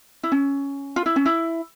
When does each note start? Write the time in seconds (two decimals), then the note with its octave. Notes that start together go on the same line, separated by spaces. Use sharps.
0.23 E4
0.32 C#4
0.96 F4
1.06 E4
1.16 C#4
1.25 E4